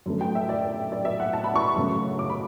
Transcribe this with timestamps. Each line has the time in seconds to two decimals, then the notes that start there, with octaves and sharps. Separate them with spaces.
0.06 F#2 D3 A3
0.21 G5
0.35 E5
0.49 D5
0.92 D5
1.05 E5
1.20 F#5
1.33 A5
1.44 B5
1.56 C#6
1.76 F#2 C#3 F#3 A3
2.19 D6
2.30 B5